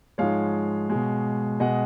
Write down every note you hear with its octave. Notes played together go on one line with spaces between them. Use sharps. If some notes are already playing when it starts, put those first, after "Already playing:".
G#2 F3 G#3 C#5 F5
B2 G#3
B2 G#3 D#5 F#5